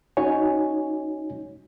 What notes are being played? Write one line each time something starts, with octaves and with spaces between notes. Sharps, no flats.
C#4 D#4 F#4 C#5 G#5